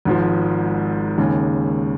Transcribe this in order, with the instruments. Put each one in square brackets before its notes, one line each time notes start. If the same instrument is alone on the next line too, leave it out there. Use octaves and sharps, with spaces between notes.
[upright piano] G#1 G#2 F3
D#2 C#3 G#3